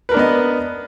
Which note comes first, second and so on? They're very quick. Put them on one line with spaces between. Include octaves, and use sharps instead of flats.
B4 A#4 D4 B3 D#5